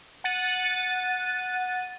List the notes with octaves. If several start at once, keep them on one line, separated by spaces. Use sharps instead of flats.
F#5 A6 D#7